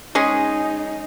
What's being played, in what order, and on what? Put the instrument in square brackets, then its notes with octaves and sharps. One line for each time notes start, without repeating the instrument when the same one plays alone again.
[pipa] G#3 C#4 G#4 [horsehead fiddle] D#4